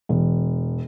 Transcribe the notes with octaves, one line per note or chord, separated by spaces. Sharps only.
E1